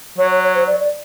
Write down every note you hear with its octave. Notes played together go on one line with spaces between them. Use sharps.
F#3 C#5
C#5
C#5
C5
D5
D5